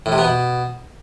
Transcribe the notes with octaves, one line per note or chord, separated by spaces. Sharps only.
A2
C3
B3
B2